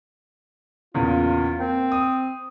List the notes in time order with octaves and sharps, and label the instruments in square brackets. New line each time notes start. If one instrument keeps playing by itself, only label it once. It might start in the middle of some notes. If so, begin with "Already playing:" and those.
[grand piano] E2 A#2 C#3 [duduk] F4
[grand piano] A#3 [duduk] C4
[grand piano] D#6